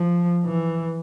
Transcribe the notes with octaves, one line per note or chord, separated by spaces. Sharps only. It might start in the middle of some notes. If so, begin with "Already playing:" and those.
Already playing: F3
E3